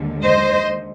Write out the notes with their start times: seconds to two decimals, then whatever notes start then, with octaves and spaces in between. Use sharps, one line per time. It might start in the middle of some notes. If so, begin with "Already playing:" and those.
Already playing: D#2 D3 G#3
0.23 C5 D#5